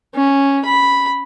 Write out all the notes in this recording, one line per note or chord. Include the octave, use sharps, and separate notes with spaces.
C#4
B5